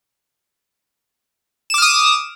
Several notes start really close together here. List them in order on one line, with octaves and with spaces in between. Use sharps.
E7 D6 F6 D#6